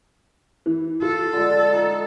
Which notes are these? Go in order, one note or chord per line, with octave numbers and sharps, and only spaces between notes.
E3
F4 A4
D3 G#3
D#4